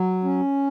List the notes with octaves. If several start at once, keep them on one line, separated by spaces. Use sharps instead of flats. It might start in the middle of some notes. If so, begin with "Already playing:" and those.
Already playing: F#3
C#4